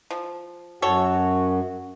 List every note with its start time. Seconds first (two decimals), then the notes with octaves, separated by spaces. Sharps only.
0.11 F3
0.82 F#2 F#4 A4 C#5